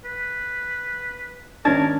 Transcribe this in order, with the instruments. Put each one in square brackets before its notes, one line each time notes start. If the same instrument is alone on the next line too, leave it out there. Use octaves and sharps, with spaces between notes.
[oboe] B4
[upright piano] G#1 C#4 D4 [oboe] A#4 [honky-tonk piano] A5 G#6 A6